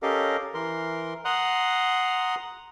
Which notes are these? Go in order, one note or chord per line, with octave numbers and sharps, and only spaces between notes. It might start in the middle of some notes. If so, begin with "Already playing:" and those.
C#4 G4 A4 A#4 D#5 F5
E3 A#4 C6
F#5 A#5 C6 D#6 F#6